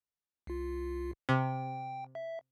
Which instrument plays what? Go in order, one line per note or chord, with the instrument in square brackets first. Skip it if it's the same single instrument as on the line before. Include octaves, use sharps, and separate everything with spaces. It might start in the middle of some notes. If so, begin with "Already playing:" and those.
[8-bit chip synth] C2 F4
[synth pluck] C3 [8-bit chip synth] G5
[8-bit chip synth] E5